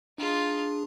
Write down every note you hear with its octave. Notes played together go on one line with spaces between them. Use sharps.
D4 D#4 F4 G#4